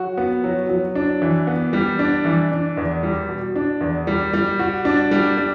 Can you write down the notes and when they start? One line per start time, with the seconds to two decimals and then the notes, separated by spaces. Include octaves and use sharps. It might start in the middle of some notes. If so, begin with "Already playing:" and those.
Already playing: F#3 F#4
0.18 B3
0.44 F#3
0.69 F#3
0.95 D4
1.22 E3
1.47 B3
1.73 G3
1.99 D4
2.25 E3
2.52 D4
2.77 E2
3.03 G3
3.29 B2
3.56 D4
3.81 E2
4.07 G3
4.33 G3
4.59 F#4
4.85 D4
5.11 G3
5.37 G3